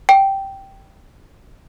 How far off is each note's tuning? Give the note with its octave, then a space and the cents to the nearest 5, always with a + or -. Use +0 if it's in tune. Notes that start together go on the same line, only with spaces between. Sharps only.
G5 -10